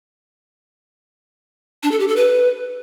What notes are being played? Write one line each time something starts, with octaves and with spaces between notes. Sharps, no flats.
D4
A4
G4
A4
B4